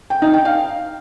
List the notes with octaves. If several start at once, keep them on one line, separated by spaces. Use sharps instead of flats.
G5
D#4
G5
F5